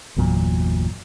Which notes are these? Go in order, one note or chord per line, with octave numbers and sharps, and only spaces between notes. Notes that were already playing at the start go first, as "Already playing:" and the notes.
G1 E2 A#2 F#3